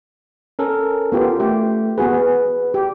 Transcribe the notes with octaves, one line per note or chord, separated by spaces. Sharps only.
C#4 A4 A#4
B3 F4 G4
A3 G4
B3 F#4 G#4 B4
G4